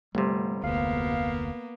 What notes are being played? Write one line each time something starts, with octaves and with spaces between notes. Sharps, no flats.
G1 C3 G3 A3 C4
F1 D2 A#3 B3 F5